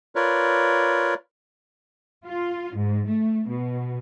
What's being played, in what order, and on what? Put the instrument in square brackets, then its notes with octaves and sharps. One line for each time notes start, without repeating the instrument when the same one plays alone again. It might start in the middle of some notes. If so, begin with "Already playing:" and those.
[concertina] F4 A#4 B4 C#5 D5
[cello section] F4
G#2
A3
B2